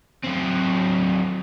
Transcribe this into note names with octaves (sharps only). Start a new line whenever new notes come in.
F#3 C4